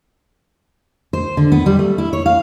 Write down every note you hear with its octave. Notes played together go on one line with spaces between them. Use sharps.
C5
D3
B3
G3
A3
E4
C#5
F5